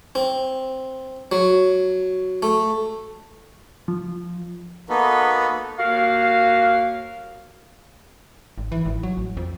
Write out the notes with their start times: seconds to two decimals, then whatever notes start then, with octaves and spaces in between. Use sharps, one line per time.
0.15 C4
1.32 F#3
2.43 A3
3.88 F3
4.89 A#3 B3 D#4 F#4 A4 B4
5.79 D#2 F#4 A#4 F5
8.58 G#1
8.72 E3
8.86 G#1
9.03 F#3
9.17 A1
9.37 F2